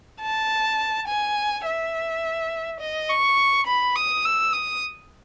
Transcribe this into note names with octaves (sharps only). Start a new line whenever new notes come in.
A5
G#5
E5
D#5
C#6
B5
D#6
E6
D#6